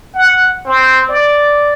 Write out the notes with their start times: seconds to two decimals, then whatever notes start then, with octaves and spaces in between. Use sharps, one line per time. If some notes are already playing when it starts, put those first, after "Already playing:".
0.14 F#5
0.66 C4
1.09 D5